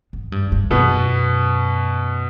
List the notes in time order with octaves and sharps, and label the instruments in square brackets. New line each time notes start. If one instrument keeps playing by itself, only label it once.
[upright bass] G#2
G2
G2
[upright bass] F#2 [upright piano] B2 B3